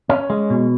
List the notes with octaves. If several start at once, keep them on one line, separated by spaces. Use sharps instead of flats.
C#4
G#3
B2